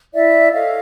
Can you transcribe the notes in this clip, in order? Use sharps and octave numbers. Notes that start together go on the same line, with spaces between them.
E4 D5 E5
A4 C#5 D#5 F5